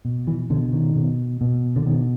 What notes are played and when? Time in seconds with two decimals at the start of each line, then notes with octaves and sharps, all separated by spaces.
0.05 B2
0.27 E3
0.50 B2 D3
0.73 D#3
0.96 B2
1.41 B2
1.76 D3
1.86 B2 D#3